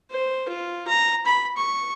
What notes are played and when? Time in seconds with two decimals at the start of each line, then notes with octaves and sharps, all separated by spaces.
0.11 C5
0.48 F4
0.87 A#5
1.26 B5
1.57 C#6